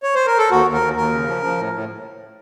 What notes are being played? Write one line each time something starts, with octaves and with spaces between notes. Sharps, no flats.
C#5
C5
A#4
A4
D#2 F#4
D#2
A#4
D#2
D#2 A#4
C#3
F3
F3
A2
A2